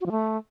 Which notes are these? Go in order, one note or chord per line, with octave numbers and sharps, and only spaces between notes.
F#4
F3
A3